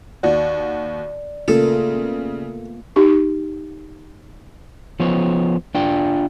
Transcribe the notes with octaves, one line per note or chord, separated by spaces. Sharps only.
D#2 F#4 D5
C#3 A3 A#3 F4 A4
B3
D#4 G4 C#6
F3 B3 C5 C#5
D4 F4 D5 G5